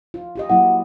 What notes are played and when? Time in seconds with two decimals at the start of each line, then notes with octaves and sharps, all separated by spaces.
0.14 F4
0.36 F4 G4 D#5
0.50 F#3 A#3 E4 F#5